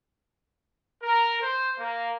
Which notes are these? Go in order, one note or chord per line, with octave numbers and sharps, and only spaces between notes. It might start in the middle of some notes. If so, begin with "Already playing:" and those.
A#4
C5
A#3